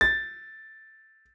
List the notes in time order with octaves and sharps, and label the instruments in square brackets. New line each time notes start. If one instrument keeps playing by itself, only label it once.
[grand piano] A6